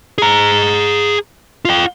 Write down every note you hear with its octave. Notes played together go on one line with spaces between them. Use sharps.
G#4 A#5
F4 G5